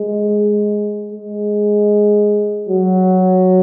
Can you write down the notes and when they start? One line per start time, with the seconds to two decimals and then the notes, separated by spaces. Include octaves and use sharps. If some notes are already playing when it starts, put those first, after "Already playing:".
Already playing: G#3
1.12 G#3
2.69 F#3